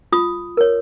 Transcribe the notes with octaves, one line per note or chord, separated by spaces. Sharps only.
F4 D#6
A#4 C#5